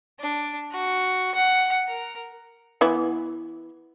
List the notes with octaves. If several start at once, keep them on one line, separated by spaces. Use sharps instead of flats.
D4
F#4
F#5
A#4
E3 B3 E4